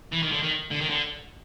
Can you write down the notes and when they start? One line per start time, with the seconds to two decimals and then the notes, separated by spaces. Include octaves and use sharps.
0.12 E3
0.22 D#3
0.31 D3
0.42 D#3
0.71 D3
0.81 D#3
0.90 D3